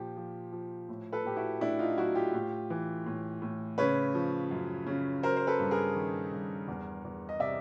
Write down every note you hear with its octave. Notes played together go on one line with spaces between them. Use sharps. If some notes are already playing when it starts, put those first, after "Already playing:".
Already playing: A#2 F3 G4
F3
F3
A2
A4 B4
A2 G4
E4 F#4
A2 D4 E4
D#4 F4
F#3 E4 F#4
F4 G4
A2
E3
A2
A2
C#3 B4 C#5
F3
F#2
C#3
F#3 A#4 C5
C5
A4 B4
G2
G#4 A#4
D#3
G2
E2
E2
D#5
C3 D5 E5